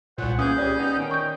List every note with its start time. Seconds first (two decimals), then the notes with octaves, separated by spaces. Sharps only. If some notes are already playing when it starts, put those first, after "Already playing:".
0.18 C2 A#2 C5 C#5 F#5
0.39 E3 A#3 C#4 G#4 D#6 G6
0.58 G3 C4 G#4 C#5 D5
0.78 B3 D#4
0.97 D#3 G5
1.11 C#6 G6